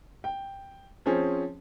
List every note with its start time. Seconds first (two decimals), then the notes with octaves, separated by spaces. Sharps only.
0.24 G5
1.06 F3 C4 C#4 G#4